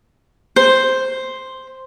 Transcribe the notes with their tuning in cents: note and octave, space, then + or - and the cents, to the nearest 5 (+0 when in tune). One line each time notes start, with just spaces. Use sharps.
C5 +0